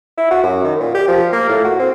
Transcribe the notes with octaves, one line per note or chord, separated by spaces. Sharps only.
E4
F#4
F#2
D#3
A#2
G4
F3
A#3
A2
F#4
C4